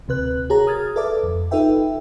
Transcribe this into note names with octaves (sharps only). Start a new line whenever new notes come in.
D2 C3 B4 F#6
F#4 G#4 A#4 C#5 A5 A#5
D#6 F6 G#6 A6
A4 B4 D5 E5 A5 D6
F2
D#4 F4 A4 B4 E5 G5